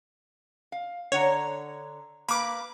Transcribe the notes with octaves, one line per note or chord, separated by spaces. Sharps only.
F5
D3 C#5 F#5 A#5
A#3 B4 B5 D6